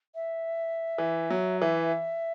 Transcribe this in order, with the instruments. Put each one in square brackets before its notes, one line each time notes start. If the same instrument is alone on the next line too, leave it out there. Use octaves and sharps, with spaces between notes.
[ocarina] E5
[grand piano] E3
F#3
[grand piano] E3 [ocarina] E5